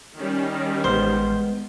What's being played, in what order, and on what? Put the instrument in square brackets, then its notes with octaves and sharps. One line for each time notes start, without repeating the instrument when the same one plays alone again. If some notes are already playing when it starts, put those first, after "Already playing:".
[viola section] D#3 G3 [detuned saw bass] C#4
[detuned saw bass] A1 [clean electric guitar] G#3 B3 [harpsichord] C5